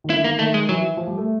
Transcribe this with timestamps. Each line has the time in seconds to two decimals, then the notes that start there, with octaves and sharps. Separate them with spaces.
0.04 D#3
0.10 D3 E4
0.24 D#3 A#3
0.39 D#3 A3
0.54 G#3
0.69 E3 F#3
0.97 F3
1.07 G3
1.18 A3